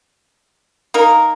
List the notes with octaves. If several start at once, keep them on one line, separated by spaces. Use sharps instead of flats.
A#3 D#4 A#4